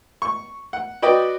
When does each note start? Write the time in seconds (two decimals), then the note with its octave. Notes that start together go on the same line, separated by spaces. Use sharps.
0.22 C#6
0.73 F#5
1.02 F#4 B4 D5 D#5 G5